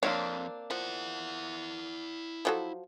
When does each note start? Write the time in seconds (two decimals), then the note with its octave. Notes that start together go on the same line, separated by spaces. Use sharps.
0.03 F2 A#3 C4 D4 C#5
0.71 F3 E4 F#5
2.45 F3 F#3 A4